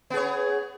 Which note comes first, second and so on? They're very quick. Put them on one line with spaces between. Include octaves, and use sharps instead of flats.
B3 G#4 C#5